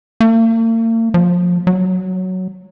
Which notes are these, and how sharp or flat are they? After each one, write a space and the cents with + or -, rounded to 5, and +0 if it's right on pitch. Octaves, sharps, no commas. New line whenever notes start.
A#3 -45
F3 +25
F#3 +5